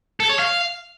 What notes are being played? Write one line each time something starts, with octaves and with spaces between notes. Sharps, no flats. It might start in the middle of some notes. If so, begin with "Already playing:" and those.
A4
C#5
F5